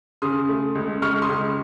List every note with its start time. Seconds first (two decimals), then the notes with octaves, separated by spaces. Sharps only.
0.22 C#3 C6 D#6
0.49 A3
0.75 C#2
1.02 C#2 C#6 F6
1.22 C6 D#6
1.28 C#2